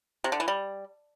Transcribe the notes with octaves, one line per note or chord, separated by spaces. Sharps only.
C3
D3
E3
G3